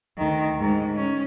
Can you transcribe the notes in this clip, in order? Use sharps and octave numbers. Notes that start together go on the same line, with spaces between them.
D2 D#3
G#2
C#4